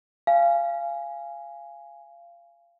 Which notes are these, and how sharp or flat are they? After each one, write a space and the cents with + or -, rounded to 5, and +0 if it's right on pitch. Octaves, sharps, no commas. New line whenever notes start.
F5 -20 G#5 +0